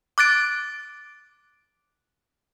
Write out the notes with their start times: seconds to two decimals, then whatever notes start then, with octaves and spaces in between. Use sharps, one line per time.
0.18 D6 F#6 A6 D7